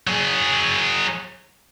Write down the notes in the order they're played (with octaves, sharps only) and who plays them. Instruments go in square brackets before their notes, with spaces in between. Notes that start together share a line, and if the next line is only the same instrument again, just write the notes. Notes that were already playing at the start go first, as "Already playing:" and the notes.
[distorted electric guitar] F#3 G#4